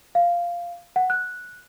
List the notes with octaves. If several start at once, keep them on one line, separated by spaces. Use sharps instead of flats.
F5
F#5
F#6